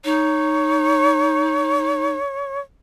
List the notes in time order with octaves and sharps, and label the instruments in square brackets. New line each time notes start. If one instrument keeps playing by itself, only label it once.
[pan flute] D#4 [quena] C#5